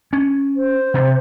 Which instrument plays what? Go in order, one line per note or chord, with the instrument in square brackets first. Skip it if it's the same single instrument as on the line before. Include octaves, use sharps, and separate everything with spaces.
[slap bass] C#4
[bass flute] C5
[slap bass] C3